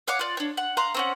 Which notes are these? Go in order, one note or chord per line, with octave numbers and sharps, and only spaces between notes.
C#5 F5 F#5 D6
F4 D5
D4 C#5
F#5
F5 A#5 C6 F#6
C4 C#4 F#5